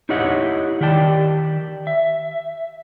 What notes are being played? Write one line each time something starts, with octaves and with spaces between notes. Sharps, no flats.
D#4 E4 G4 C#5 D#5 F#5
D#3 G4 D5 G5 A5
E5